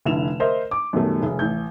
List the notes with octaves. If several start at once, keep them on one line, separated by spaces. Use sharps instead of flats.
F1 D3 E4 E7 F7
A#4 C5 D#5 E5
D6
F#2 B2 D#3 G3 A3
F1 G#4
A1 G6